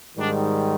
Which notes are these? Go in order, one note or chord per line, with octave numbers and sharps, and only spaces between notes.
G#2 D#3 G3 D4